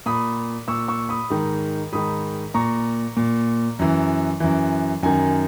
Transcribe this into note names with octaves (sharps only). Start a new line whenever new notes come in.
A#2 B5 D#6
A#2 C#6 E6
C#6 E6
B5 D#6
G#2 D#3
G#2 D#3 B5 D#6
A#2 A#5 C#6
A#2
F#2 E3
F#2 E3
F#2 D#3 G#5